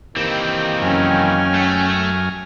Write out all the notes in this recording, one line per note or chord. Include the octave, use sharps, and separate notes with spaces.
D#3 E3 A#3 C4 G4
F#2 C#4 G5 G#5 F6
A3